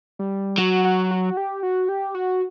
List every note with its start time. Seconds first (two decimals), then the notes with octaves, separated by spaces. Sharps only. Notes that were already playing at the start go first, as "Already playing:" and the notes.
0.19 G3
0.58 F#3 F#4
0.84 F#4
1.11 F#4
1.37 G4
1.63 F#4
1.89 G4
2.15 F#4